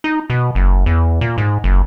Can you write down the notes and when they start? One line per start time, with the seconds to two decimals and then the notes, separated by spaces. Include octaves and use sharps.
0.04 D#4
0.30 B2
0.55 F#1
0.86 E2
1.21 A#2
1.38 G#2
1.64 F#1